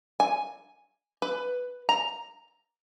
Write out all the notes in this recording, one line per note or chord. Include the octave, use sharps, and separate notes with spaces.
G#5
B4
A#5